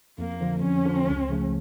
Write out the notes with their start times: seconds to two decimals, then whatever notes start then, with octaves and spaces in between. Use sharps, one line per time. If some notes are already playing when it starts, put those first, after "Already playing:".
0.18 F2 A#3
0.41 D3 F3
0.62 F2 C#4
0.85 D3 F3
1.07 C#2
1.29 C#3 F3 A3